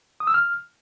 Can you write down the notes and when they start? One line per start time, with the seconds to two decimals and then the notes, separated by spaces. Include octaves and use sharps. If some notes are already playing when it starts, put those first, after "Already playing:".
0.20 D#6
0.27 E6
0.34 F6